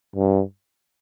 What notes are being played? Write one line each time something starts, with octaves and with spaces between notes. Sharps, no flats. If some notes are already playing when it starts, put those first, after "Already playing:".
G2